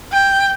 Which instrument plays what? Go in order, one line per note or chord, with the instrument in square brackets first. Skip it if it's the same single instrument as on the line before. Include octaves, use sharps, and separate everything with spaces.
[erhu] G5